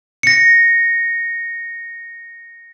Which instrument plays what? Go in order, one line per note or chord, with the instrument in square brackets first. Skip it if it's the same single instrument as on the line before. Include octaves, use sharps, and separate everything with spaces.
[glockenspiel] A#6 C#7